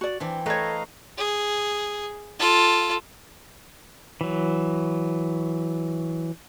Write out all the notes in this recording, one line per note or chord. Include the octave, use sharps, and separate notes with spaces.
F#4 D5
E3 C4 D4
A3 A4 B4 C#5 D#5 F5 A#5
G#4
F4 A4
E3 F#3